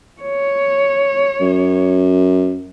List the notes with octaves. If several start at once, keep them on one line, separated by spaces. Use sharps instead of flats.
C#5
F#2